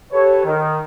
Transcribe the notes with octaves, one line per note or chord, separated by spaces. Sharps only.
G4 A4 B4 C#5
D#3